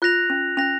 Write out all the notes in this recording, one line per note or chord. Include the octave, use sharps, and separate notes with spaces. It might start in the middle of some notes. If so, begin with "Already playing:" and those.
F4 F#6 A#6 F7
C#4
C#4 F#6 A#6 F7